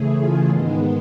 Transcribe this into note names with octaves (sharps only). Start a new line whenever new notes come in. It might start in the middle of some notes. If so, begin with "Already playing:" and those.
Already playing: C#3 E3 A3 G#4
F4
G#2 D#3 G#3 B3